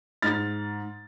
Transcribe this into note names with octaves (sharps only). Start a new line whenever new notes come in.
G#2 F6 A6